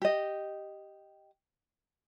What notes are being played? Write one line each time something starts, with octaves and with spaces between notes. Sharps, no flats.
G4 D#5